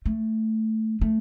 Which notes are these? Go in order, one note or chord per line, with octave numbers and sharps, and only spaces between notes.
A3
A3